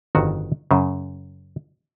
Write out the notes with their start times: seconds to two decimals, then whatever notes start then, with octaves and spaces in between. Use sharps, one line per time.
0.15 G1 F2 D#3 F#4
0.71 F#2 C#3